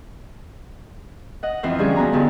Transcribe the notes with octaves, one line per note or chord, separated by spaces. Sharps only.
D#5 F#5
F2 E3 C5 F6
D3 F3 G3 C#4 G#4
B3 C#4 F#4 G#5 A#5
E2 G2 D3 D#3